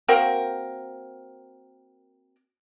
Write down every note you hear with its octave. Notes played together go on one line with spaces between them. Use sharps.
A#3 C4 F#4 A#4